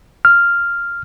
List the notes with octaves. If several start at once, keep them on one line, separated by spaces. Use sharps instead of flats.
F6